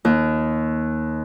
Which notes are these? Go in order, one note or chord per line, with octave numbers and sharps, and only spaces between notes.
D#2